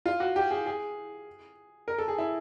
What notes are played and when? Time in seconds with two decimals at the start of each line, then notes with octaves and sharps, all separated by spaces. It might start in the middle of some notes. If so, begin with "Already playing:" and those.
0.06 F4
0.20 F#4
0.36 G4
0.51 G#4
0.66 G#4
1.88 A#4
1.98 A4
2.08 G#4
2.18 E4